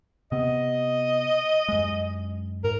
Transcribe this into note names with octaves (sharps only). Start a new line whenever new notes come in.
C3 B3 D#5
F#2 G#3
G#2 A#4